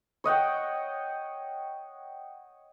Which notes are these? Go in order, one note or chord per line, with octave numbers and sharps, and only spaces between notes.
C#5 D#5 F#5 G5